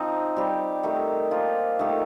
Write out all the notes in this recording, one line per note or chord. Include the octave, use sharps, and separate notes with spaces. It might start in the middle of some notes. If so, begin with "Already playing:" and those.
Already playing: F3 C4 D#4
G3 C4 G4
D#3 A3 D#4 G4
F3 A#3 F4
D#3 A3 D#4 G4